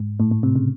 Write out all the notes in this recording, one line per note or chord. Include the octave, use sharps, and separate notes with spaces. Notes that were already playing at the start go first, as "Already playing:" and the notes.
Already playing: G#2
A2
A2
C3
C#3